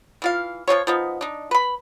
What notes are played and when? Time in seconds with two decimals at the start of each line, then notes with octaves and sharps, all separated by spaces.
0.22 E3 F4 F5
0.68 F3 G3 F4 C#5
0.87 F3 B3 D#4
1.21 D4 D#4
1.51 B4 B5